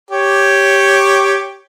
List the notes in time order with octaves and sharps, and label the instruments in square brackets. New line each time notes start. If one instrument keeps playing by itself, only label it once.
[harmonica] G4 C#5